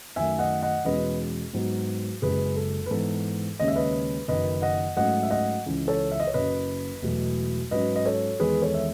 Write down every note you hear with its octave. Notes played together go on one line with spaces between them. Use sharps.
F#2 D#3 A3 E5 G#5
D#5 F#5
D#5 F#5
E2 B2 G#3 C#4 B4 D#5
G#2 F#3 B3
F#1 F#2 C#3 G#3 G#4 B4
A4
B4
G#2 E3 B3 A4
D#2 C#3 G#3 C#4 D#5
E5
B4 D#5
F#1 F#2 D#3 B4 D#5
D#5 F#5
G#2 F#3 A3 C#4 D#5 F#5
E5
D#5 F#5
C#2 C#3 E3
A4 C#5
E5
D#5
C#5
F#1 F#2 C#3 B4 D#5
E1 E2 B2 F#3 A3
G#2 F#3 C#4 B4 D#5
D#5
A4 C#5
E2 D#3 G#3 G#4 B4
A4 C#5
E5